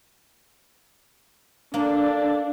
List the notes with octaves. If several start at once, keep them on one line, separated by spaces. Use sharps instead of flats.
A#3 D4 A4